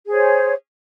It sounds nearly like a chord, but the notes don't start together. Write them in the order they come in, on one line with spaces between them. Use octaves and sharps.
G#4 C5 C#5